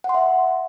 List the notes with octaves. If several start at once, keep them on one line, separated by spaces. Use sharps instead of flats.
F#5
C6
E5